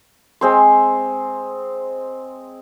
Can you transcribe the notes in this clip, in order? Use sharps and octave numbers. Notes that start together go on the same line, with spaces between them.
G#3 C4 C6